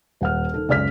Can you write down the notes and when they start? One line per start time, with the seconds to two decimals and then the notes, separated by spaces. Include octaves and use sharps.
0.21 D#1 F#5 F6
0.54 D#3 A4
0.69 C#2 F#2 D5 F6 B6